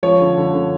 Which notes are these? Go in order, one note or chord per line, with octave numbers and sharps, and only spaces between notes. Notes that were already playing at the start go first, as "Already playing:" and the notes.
F3 C#5
D3
D3
D3